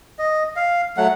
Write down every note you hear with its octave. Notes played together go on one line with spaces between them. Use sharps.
D#5
F5
F#3 A3 F#5